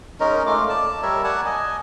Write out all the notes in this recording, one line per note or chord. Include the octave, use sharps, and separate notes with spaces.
G#3 C#4 D#4 A#4
A3 F4 D6
D5 A5
G3 A#4 C#5 E5
D5 F#5 G#5 A5
D#5 G#5